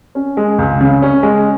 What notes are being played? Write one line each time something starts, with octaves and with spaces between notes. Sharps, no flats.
C#4
G#3
C#2
C#3
C#4
G#3